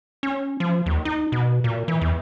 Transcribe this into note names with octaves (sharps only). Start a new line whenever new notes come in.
C#4
F3
D#2
D#4
B2
A#2
E3
E2